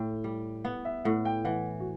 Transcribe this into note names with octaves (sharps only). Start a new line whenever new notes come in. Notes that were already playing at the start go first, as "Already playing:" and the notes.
Already playing: A2 G5
G3
B3 F#5
E5
A2 F#5
G5
E3 F#5
F#4